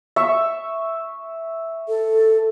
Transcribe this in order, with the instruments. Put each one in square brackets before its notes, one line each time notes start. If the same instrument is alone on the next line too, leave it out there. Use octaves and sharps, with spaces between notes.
[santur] E5 C#6
[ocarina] A4